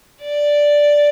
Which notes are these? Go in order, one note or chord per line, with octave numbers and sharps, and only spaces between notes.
D5